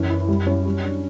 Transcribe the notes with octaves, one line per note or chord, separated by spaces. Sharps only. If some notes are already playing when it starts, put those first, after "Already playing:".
Already playing: F#2 E3 C#4
E4
G3
C#4
G3
D4